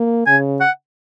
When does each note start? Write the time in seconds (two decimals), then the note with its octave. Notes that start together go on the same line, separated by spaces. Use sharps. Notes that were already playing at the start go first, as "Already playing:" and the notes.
Already playing: A#3
0.27 C#3 G#5
0.61 F#5